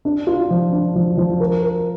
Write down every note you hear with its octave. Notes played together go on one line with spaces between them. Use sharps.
D4
F4
F3
D4
F3
F3
A#4
A#4